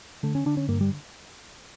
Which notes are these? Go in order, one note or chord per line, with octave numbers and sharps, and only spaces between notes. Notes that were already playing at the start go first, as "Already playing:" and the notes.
D3 A3
C#4
D3 D4
C#4
G2 A#3
G3